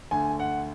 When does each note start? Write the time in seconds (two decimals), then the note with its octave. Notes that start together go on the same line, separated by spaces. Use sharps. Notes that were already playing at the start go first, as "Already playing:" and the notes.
0.11 D2 D3 G#5
0.40 F#5